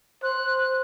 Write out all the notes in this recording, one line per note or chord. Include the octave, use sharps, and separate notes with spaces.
C5 F#6